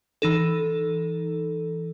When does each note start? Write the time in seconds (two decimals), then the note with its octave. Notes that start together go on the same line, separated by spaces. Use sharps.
0.22 E3 D#4 A4